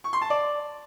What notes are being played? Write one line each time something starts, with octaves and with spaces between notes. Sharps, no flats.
C#6
C6
A5
D5